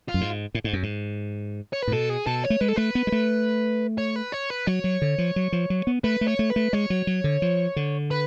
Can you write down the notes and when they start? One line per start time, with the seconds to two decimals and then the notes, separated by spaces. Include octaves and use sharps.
0.09 F4
0.14 F#2
0.21 G#2
0.55 A2
0.64 G#2
0.73 F#2
0.83 G#2
1.73 C#5
1.82 B4
1.87 A2
1.92 B2 A4
2.09 G#4
2.26 B2 A4
2.44 C#5
2.50 A3
2.61 G#3 B4
2.69 A4
2.77 A3 B4
2.95 B3
3.07 G#3
3.12 A3
3.98 C#5
4.16 B4
4.32 C#5
4.50 B4
4.67 F#3 C#5
4.84 F#3
5.02 D3
5.18 F3
5.36 F#3
5.52 F3
5.70 F#3
5.87 B3
6.04 A3 B4
6.21 A3
6.27 C#5
6.39 A3
6.50 B4
6.56 A3
6.73 G#3 C#5
6.90 F#3
7.07 F#3
7.24 D3
7.42 F3
7.76 D3
8.11 B4